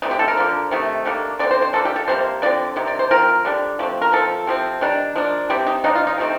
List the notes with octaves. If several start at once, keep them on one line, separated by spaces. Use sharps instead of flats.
D3 A3 C4 D#4
G4
A4
A#4
D3 F3 A#3
C3 D#3 A3
D3 G3 A#3 D4
D3 G3 C4 D5
C5
C5
F3 A#3 D4 A4
G4
A4
C3 G3 A#3 C5
D3 F3 C4 D5
C3 D#3
D5
C5
F3 C4 A#4
D3 G3 D4
F3 A3 C4
A#4
F3 C4 A4
C3 F3 C4
D#3 G3 D4
F3 A#3 D4
C3 G3 C4 G4
D#4
D#3 A#3 D4 D#4
F4
D#4
C3 F3 A3 C4